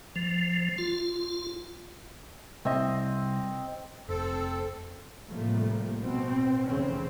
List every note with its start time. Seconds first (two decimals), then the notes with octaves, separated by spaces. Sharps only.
0.16 F3
0.78 F4
2.65 C2 C4 D#5 E5
4.09 F1 C4 A4
5.30 A2 C3 F3 G3 A3 A#3
6.00 B2 C4
6.68 F1 C#3 E3 C4 C#4